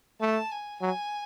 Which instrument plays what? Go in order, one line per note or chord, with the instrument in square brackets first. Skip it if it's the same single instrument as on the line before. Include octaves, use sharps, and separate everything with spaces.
[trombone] A3 [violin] A5
[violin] G#5
[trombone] F#3 [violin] G#5